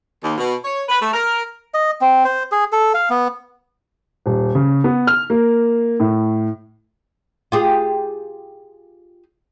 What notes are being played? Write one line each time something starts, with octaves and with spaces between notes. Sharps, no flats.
D#2
B2
C#5
B4
A3
A#4
D#5
C4
C5
G#4
A4
F5
B3
D#1
C#3
B3
F6
A#3
A2
F4 G4 G#4